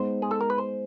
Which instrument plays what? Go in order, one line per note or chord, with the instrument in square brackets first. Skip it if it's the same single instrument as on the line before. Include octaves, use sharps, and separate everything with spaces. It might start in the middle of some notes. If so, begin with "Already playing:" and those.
Already playing: [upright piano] G#3 B3 D#4 [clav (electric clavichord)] C5
[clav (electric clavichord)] G#4
A4
A#4
B4
C5